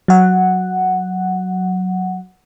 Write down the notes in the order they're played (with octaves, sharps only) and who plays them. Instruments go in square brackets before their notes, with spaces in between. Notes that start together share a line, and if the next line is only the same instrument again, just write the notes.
[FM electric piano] F#3 F#5